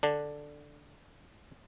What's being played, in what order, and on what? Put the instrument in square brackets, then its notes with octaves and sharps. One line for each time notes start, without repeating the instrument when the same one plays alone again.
[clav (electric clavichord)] D3 D4